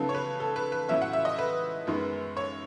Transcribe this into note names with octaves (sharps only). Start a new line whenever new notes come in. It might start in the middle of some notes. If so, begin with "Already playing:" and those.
Already playing: C#3 F#3 B3 D#4 A4
C#5
B4
A4
B4
B4
A2 F#3 C#4 E5
F#5
E5
D#5
B4
F#2 D#3 G#3 B3
C#5